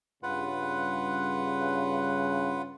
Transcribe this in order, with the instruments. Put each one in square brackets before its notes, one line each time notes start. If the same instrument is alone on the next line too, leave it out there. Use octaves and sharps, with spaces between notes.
[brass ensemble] G2 C#3 [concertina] F4 B4 F#5